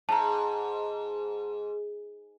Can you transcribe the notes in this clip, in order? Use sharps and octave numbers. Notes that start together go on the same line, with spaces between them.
G#2 A5 A#5